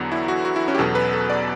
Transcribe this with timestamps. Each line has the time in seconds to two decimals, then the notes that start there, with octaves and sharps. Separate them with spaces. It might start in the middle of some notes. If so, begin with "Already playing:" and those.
Already playing: E2 D3 F#3 B3 F#4
0.12 E4
0.28 F#4
0.45 F#4
0.56 E4
0.68 C#4
0.75 G4
0.78 E2 B2 F#3 B3 A4
0.95 B4
1.13 A4
1.30 D5